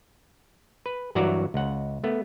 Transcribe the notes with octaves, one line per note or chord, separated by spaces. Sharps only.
B4
G2 E3 F#3 F#4 D5 A#5
C#2 F#5
A3 B3